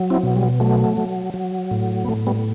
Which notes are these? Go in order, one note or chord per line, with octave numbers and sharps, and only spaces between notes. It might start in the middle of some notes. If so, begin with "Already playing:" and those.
Already playing: F#3
C4 E4
B2
G3
F#3 A3
F#3
F#3
A2
B3
A2 A3
G3 B3